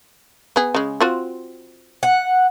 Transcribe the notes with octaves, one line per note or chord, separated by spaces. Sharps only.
B3 G#4
C#3 G#3
C4 F4 F#4
F#5